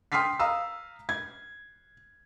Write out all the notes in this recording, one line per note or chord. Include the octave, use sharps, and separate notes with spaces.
G5 C6 D#6 F6 B6 C7
F5 A#5 D#6 E6
G#6